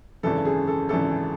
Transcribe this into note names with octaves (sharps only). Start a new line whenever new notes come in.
G#1 F#2 C#3 E3 A4
G#4
A4
G#1 F#2 C#3 E3 A4